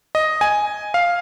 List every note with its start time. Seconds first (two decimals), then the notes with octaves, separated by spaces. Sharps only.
0.15 D#5
0.41 G#5
0.94 F5